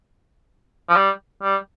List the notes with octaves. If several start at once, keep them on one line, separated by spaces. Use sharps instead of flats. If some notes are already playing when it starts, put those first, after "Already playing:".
F3
G3
G3